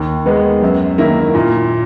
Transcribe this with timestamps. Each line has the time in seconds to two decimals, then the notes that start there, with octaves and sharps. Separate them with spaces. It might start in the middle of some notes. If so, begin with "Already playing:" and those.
Already playing: D#2
0.26 D#3 G#3 B3
0.62 F#2
0.98 D#3 A#3 E4
1.35 A#2